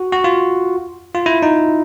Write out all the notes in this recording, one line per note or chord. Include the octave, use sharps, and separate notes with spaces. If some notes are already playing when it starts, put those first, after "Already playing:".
Already playing: F#4
F#4
F4
F4
E4
D#4